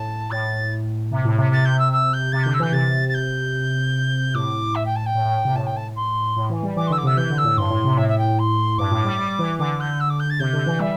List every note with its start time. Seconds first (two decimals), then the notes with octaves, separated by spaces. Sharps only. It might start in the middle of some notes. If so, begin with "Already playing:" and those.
Already playing: A2 A5
0.30 A2 A6
1.11 C3
1.25 A2
1.38 C3
1.52 C3 A6
1.65 G6
1.79 E6
1.92 E6
2.13 G6
2.32 C3 A6
2.42 D3 G6
2.53 E6
2.59 E3 G6
2.72 C3 A6
3.08 A6
3.14 G6
4.34 A2 D6
4.75 E5
4.85 G5
4.95 A5
5.05 G5
5.15 A2
5.25 A2
5.45 C3
5.55 A2 A5
5.66 G5
5.76 A5
5.95 C6
6.36 A2
6.50 E3
6.63 G3
6.77 E3 D6
6.87 C6
6.90 D3 E6
6.97 D6
7.03 C3 E6
7.17 E3 G6
7.30 D3
7.37 E6
7.44 A2
7.57 G2 C6
7.71 A2
7.84 C3
7.97 A2 E5
8.08 E5
8.18 G5
8.38 C6
8.78 G2 D6
8.91 A2
9.05 G3
9.18 G3
9.39 E3
9.59 D3 D6
9.79 D3 G6
10.00 E6
10.09 D6
10.19 G6
10.29 A6
10.39 C3 G6
10.53 D3
10.66 E3
10.80 G3 E5